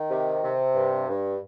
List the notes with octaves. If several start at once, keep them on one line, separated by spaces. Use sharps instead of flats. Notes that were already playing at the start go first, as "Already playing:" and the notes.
Already playing: D#3
C3
C3
G2
G2